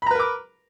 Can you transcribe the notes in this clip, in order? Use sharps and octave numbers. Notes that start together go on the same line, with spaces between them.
A#4 B4 A#5 B5 D6